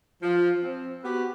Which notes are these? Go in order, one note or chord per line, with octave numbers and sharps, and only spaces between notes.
F3
C4
B3 F#4 G4 B4